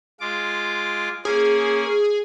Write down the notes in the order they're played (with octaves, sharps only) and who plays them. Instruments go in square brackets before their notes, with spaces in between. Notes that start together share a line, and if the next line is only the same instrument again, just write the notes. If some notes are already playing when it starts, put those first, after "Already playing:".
[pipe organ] G#3 F4 D6
[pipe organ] A#3 C#4 [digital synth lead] G#4